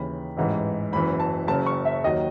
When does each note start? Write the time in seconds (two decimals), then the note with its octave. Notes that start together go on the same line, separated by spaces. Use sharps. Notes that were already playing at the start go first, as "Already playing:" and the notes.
Already playing: D#2 C#3 E3 B5
0.37 A1 G#2 E3
0.93 F#1 F#2 E3 B5
1.20 A5
1.48 F#1 F#2 C#3 A5
1.66 C#6
1.85 E5
2.04 D#2 D#3 F#3 D#5